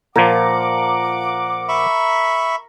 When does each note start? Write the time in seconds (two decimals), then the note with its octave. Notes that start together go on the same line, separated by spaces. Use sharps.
0.16 A#2 F3 A#4 F#5 D6
1.68 E5 B5 C#6